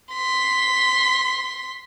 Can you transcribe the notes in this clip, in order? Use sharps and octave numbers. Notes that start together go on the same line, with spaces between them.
C6 B6